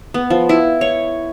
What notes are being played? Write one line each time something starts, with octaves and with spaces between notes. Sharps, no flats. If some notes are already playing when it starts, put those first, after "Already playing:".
B3
F3
E4
C#5